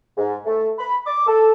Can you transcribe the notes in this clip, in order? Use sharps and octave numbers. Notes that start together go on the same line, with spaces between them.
G#2
A3
B5
D6
A4